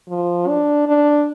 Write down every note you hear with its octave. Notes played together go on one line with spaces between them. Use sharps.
F3
D4
D4